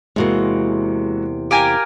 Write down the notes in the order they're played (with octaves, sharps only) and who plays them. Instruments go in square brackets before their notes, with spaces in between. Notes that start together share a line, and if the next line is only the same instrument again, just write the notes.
[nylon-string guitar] E2 C3 A#3 [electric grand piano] G#3 E4 F#4
[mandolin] G4 A#4 G#5 [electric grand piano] F5